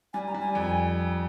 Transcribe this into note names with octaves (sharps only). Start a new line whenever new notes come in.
G3 G#5
A#5
G3
G#5
F2